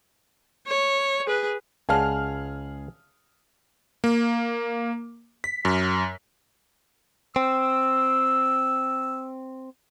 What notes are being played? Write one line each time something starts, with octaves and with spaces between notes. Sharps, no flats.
C#5
G#4 B4
C#2 G#4 D5 F5 F#5 A5 F6
A#3
B6
F#2
C4 E6